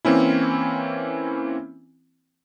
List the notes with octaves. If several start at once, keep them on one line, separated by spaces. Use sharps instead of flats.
E3 A#3 C4 C#4 E4